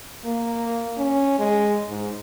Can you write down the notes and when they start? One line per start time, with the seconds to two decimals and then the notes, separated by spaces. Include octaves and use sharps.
0.25 A#3
0.98 C#4
1.39 G#3
1.90 G#2